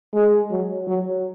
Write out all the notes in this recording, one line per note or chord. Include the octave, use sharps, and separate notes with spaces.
G#3
F#3
F#3